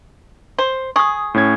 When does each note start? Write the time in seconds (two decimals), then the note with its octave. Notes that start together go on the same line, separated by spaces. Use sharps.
0.58 C5
0.96 G#4 C#6 D#6
1.34 A2 C#4 G#6